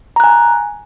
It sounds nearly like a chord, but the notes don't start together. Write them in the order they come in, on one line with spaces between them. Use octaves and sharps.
A#5 F#6 G#5